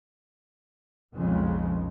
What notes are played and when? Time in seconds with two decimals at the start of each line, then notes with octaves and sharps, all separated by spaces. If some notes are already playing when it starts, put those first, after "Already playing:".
1.13 B1 F2 A#2 C#3 G#3